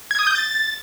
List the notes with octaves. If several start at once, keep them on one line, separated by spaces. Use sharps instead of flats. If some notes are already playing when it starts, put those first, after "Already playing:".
G#6
D#6
G6
A6